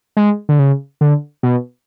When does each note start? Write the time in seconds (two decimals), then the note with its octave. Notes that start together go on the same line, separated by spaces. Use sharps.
0.17 G#3
0.49 D3
0.59 C#3
1.01 D3
1.43 B2